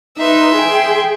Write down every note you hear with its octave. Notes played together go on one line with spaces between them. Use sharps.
D#4 B4 E5 C6
G#4 G5